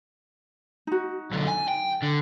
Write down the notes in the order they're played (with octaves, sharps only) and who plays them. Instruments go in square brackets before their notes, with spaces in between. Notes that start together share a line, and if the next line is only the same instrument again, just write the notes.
[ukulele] D#4 F#4
[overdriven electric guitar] B1 D3
G#5
G5
D3